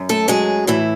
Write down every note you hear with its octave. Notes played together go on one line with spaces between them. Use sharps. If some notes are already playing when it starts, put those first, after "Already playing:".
Already playing: F#2
A3 A4
F#3 G#3 G#4
A2 E3 E4